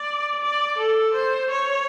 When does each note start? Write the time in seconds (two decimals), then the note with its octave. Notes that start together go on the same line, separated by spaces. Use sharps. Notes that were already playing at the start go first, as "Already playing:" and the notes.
Already playing: D5
0.41 D5
0.78 A4
1.14 C5
1.50 C#5